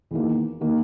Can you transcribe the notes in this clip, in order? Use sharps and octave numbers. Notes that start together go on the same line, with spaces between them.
E2 D#3 A#3
D#3 A#3